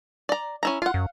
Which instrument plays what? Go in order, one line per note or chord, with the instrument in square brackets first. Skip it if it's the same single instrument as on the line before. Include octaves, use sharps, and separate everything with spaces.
[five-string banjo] D5 A#5
C#4 E4 A#5
[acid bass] F4 [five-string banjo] F5 F#5
[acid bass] F#2